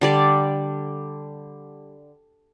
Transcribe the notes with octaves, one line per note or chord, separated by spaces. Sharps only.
D3 G3 D5